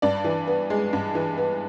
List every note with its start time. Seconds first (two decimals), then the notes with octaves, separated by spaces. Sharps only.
0.02 G2 D5
0.24 E3
0.47 B3
0.70 G#3
0.93 G2
1.15 E3
1.38 B3